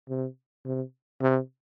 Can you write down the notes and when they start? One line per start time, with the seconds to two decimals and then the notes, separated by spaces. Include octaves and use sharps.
0.09 C3
0.65 C3
1.21 C3